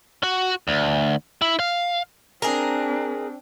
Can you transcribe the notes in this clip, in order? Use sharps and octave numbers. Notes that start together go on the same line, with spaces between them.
F#4
D2
E4
F5
C4 D4 G#4 A#4